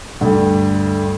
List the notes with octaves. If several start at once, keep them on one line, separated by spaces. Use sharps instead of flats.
D2 G2